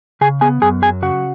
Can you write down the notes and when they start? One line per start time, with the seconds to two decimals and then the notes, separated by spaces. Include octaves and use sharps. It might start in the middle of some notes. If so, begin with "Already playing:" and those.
0.21 C#3 G#4 G#5
0.41 B3 G#4 G#5
0.62 F#2 G#4 G#5
0.82 F#3 G#4 G#5
1.02 C#3 F#4 F#5